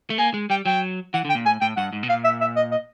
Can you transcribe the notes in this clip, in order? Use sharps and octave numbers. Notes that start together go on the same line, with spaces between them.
A3
A#3 G#5
G#3
G3 G5
F#3 G5
E3 F#5
D3
G5
A#2
A2 G#5
A2 G5
G2 F#5
G#2
B2
A#2 F5
E5
E5
D#5
D#5